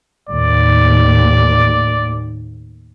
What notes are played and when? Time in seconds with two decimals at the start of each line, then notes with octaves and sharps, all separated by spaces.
0.29 D#2 A2 D5